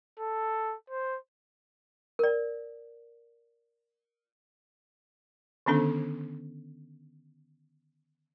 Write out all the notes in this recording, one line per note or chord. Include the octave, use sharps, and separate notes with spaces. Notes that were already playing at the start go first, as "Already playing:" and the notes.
A4
C5
A#4 D5
D3 D#3 B3 C#4 D4 A4